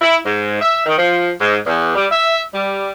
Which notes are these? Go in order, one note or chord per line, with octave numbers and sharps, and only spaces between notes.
E4
G#2
E5
D#3
F3
G#2
E2
G3
E5
G3